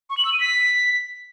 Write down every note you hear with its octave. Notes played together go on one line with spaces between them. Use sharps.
C#6
F#7
E6
D#7
B6